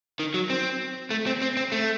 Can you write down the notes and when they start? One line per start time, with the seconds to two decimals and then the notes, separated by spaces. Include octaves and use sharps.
0.20 D#3
0.34 F#3
0.50 C4
1.10 A3
1.27 C4
1.42 C4
1.57 C4
1.72 A3